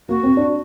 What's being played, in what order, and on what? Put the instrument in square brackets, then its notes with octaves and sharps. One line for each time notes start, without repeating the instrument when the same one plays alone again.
[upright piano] A#3 [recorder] F#4
[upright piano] C4
D4